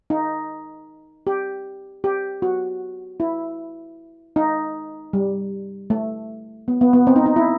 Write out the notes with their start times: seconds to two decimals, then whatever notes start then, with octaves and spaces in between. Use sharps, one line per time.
0.10 D#4
1.27 G4
2.04 G4
2.42 F#4
3.20 E4
4.36 D#4
5.13 G3
5.90 A3
6.68 B3
6.81 B3
6.93 B3
7.07 C4
7.16 D#4
7.26 D#4
7.36 E4